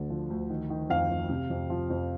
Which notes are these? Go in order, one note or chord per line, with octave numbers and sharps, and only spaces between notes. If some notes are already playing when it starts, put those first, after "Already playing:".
Already playing: D2 D3
F3
D2
D#3
D#3
F2 F5
F2
C3
F2
F3
F2